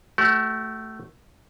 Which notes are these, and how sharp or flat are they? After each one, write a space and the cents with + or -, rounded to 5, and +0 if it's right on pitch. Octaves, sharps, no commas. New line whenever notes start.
A3 +0 F#4 +40